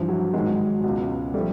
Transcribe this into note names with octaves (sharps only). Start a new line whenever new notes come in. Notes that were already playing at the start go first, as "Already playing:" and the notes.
Already playing: G2 E3 F3
F#3
G#2 D#3 F#3 G#3
C#2 B2
F3 G3 A3